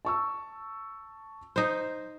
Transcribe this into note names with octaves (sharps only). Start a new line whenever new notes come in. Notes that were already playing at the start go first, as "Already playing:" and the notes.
A5 C#6 E6
D#4 C5